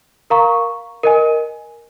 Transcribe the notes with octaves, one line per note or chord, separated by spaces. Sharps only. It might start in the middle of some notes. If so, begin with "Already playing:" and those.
A#4 F5 A#5 C#6
A#4 D#5 G#5